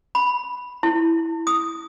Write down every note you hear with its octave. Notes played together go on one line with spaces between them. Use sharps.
B5
E4
D#6